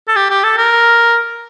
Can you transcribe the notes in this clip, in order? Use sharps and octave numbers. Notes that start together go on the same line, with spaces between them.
A4
G4
G4
A4
A#4